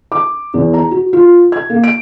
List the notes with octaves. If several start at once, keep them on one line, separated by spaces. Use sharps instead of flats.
D6
E2
A#5
F#4
F4
G#6
A#3
D7